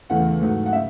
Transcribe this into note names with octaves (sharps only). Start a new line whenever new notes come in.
E2 C#3 E3 A3 F#5
G#2 F#3 A3
F#5
C#3 E5